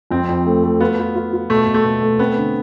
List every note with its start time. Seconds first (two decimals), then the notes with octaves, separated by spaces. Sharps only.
0.11 F2 C4
0.29 F2
0.46 A3
0.63 A3
0.80 B3 F4
0.99 F4
1.15 F4
1.33 F4
1.50 B2 A3
1.67 B2
1.74 A3
1.85 B2
2.02 A3
2.19 B3 C4
2.37 D3